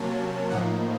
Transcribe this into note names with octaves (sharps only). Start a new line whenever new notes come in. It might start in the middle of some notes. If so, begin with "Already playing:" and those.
Already playing: C3 F#3 A#3 C#4 A5
A2 F3 A#3 D#4 F#5